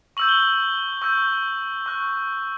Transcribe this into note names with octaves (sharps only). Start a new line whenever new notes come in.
C#6 E6 G6 F#7
G7
F#7
C#6 E6 G6
C#6 F#6